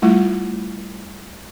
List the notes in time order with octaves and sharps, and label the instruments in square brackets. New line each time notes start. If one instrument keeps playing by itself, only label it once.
[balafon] G3 A3 E4 F4